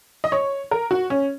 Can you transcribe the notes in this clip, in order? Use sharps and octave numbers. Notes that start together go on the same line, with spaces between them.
D#5
C#5
A#4
F#4
C#4